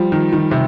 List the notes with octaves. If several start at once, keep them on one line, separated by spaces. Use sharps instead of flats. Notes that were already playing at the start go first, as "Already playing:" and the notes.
Already playing: F3 G3
D#3
D#3
C3